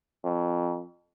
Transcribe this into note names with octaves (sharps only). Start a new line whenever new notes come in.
F2